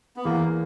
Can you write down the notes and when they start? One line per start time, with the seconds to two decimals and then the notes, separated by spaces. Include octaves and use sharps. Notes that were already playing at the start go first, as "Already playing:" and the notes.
0.16 B3
0.25 E2 A#3